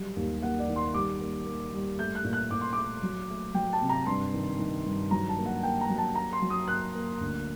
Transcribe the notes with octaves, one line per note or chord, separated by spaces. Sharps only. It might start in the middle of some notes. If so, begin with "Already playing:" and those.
Already playing: F#3 G3
D#2
A#3 F#5
D5
D#3
C6
G3 D6
A#3
A#3
G3
A3 G6
F#6
A#2
F#6
A#2 D6
C6
A3 D6
F#3
A3
F#3 G5
A5
C3
A#5
G2 C6
D#3
D#3
G2
F#3 A#5
A5
A#3
F#5
A#3 G5
A#5
F#3
A5
A#3 A#5
C6
F#3
D#6
A#3 F#6
A#3
D2